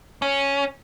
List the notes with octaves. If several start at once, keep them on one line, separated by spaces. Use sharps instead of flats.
C#4